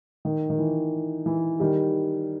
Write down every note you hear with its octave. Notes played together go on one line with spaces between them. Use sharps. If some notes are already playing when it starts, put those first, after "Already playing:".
D#3
D#3
E3
E3
D#3 G3